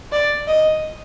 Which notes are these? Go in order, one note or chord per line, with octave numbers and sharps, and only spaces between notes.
D5
D#5